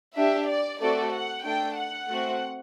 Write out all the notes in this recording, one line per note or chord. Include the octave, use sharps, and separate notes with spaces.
D4 G4 E5
D5
A3 C4 F#4 A4 D5
F#5
A3 D4 A4 G5
F#5
A3 C4 F#4